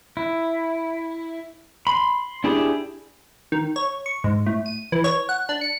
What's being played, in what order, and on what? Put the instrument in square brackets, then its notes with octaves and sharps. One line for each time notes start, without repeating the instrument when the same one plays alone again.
[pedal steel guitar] E4
B5 C6
D4 E4 G4 G#4
[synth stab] D#3
C#5
C#6
G#2
A2
D#7
E3
C#5
F#5
D4
C#7